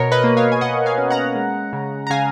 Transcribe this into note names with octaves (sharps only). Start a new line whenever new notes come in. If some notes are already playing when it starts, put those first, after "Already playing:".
Already playing: B2 A#4 C#5
B4 D#5
A#3
C#5 F5
G#5
B2 D#5 F#5
F5 G#5
C#4
F#5 A#5
G#3
C#3
A#5
C#3 F5 G#5